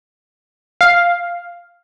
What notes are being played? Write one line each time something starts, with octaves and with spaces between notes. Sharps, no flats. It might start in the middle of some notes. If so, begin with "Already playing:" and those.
F5